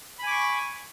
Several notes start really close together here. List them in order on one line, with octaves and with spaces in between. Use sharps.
B5 G#5 D6 C#6